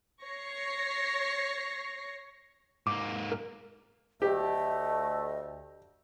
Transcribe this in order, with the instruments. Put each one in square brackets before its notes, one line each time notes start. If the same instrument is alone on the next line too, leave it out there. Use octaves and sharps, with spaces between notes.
[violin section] C#5 C#6 A#6 C7
[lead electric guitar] G#2 A#3 [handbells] D6
[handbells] A#4
[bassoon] D2 [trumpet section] A3 [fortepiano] G4 [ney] D#5